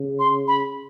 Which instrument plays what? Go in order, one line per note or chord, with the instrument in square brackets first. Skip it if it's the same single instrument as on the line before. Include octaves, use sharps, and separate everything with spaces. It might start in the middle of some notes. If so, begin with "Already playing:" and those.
Already playing: [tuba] C#3
[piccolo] C6
B5